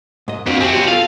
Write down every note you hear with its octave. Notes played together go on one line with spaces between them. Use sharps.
G#2 D#5
F2 C4 D4 F#4
F#2 C4 C#4 G4 G#5
F2 B2 F3
F4 A4 F5